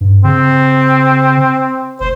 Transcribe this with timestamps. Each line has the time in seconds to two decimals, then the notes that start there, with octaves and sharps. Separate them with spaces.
0.01 G2
0.24 C#3 C4
2.00 F1 C5